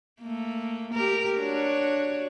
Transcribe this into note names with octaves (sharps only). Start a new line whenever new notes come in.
A3 A#3
G4 A#4
D4 F#4 C#5